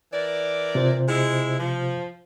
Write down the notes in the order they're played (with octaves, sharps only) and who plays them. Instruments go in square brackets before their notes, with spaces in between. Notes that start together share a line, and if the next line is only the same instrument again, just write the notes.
[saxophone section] E3 A#4 D5
[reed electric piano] C3 F4 C5
[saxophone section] G#3 E4
F3